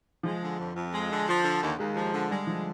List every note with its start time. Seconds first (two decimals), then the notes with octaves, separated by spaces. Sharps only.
0.23 F3 G#3
0.42 D3
0.58 F2
0.75 F2
0.93 G#3
1.10 D3
1.27 F3
1.44 D3
1.61 D#2
1.79 D#2 G#3
1.96 F3
2.13 D3
2.30 G3 G#3
2.47 D3 F3